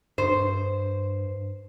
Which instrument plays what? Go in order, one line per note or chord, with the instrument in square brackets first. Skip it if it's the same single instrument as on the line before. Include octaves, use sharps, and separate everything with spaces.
[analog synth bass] G2 [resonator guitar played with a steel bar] C5